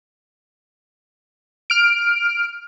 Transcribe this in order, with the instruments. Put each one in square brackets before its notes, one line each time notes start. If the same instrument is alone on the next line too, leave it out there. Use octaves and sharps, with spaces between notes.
[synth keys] F6 D7